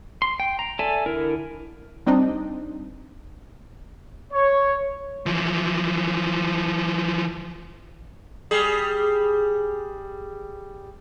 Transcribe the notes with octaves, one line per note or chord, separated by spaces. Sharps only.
C6
G5
A#5
A4 D5 E5 G#5 A5
D3 E4 A#4
G3 C4 D4 D#4
C#5
E3 F3
G3 G#4